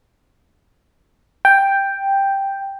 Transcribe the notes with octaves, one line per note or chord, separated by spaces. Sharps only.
G5